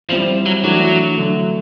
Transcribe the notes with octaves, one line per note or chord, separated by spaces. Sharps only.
F3 G3 C4 E4
F#3
E3 F#3 A3 D4 F#4
D3 F#3 A3